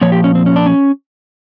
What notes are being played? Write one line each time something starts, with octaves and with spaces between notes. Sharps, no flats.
A#2 F3 C#5
G4
C#4
C4
C#4
D4
C#4